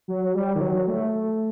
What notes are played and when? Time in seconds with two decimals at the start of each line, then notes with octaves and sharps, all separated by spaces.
0.08 F#3
0.34 G3
0.55 D#3
0.61 F#3
0.87 A3